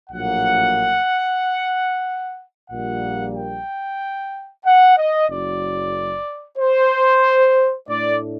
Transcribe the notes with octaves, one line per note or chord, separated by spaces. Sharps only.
A#1 A2 F#3 A#3 F#5
A#1 A#2 G3 A#3 F#5
G5
F#5
D#5
F#1 F#2 F#3 D5
C5
A2 A3 D4 D5